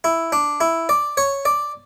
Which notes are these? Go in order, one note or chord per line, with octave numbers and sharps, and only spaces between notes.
E4
D4
E4
D5
C#5
D5